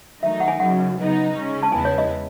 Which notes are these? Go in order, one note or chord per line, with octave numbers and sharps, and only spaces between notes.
D#3 F#3 A3 D#4 E5
F#5
G#5
F#2 C#3 F#3 F#5
C#3 F#3 B3 D#4
C#3 G#3 C#4
A5
E2 C#3 G#3 B3 E4 G#5
C#5
D#5